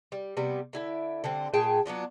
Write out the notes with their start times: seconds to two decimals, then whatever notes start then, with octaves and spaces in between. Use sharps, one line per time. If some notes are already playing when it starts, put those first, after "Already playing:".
0.12 G3
0.37 C3 G3 B3
0.73 D3 E4 E5
1.24 D3 G3 C4
1.54 A#2 G#4 G5 A5
1.86 F#3 B3 D4 F4